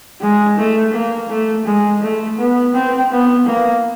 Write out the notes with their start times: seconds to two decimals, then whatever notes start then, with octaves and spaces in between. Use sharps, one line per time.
0.21 G#3
0.58 A3
0.93 A#3
1.29 A3
1.66 G#3
2.02 A3
2.38 B3
2.74 C4
3.11 B3
3.46 A#3